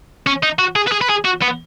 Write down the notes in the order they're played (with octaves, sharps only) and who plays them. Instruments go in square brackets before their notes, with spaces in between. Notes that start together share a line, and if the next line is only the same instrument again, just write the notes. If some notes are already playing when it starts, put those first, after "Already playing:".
[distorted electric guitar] C#4
D#4
F#4
G#4
B4
G#4
B4
G#4
F#4
B3